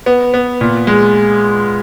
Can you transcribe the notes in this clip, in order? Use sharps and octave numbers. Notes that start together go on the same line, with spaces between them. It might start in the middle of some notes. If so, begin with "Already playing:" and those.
B3
B3
A#2
G#3